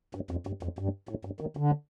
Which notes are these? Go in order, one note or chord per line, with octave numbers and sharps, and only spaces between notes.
G2
F2
G2
F2
G2
A2
G2
D#3
D3